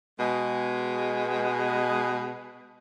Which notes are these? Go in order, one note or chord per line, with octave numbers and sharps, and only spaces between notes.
B2 G#3